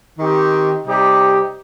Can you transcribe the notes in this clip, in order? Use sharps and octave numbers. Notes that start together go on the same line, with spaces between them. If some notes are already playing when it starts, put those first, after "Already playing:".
D#3 C4 D#4 G4
C3 G3 D#4 G4